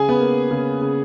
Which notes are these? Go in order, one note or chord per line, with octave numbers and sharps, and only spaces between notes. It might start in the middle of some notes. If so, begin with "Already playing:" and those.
Already playing: C#3 G#4 G#5
B3 B4
A#3
C#3
C#3